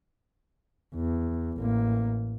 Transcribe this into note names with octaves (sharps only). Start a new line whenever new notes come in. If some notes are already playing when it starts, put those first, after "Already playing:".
E2
A1 A#3